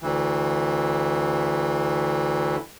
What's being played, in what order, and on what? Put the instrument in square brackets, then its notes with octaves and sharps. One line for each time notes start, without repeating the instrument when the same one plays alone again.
[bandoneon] D2 E3